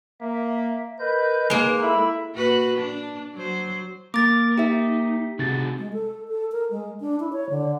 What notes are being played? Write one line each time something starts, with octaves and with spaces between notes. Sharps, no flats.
A#3 E5
A#4 B4 D#5 G6
G#3 A#3 D#4 B4
E4 A4 E5 B5
A#2 F#4 B4
D4
F#3 C5
A#3 A#4 D6 A6
D#4 G4 E5
C3 C4 F#4 G#4 A6
G#3
A4
A4
A#4
G#3
D4
E4
C#5
D3